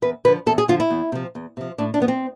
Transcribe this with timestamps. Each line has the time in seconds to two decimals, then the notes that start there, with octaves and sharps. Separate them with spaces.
0.02 E2 B4
0.25 D3 B4
0.28 F3
0.46 E2 A4
0.58 G#4
0.68 D3 F3 F4
0.80 E4
0.90 E2
1.12 C3 F3
1.35 E2
1.57 C3 F3
1.78 A2 D4
1.94 D4
2.00 F3 B3
2.08 C4